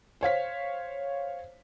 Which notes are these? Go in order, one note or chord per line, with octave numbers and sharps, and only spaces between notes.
C5 C#5 F5 B6